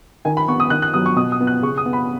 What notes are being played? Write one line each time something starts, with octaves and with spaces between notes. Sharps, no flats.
D#3 G#5
B5
B3 C#6
D#6
D#3 F#6
F#6
F#3 B3 D#6
C#6
B2 D#6
D#6
B3
F#6
C#3 C#6
D#6
B3
B5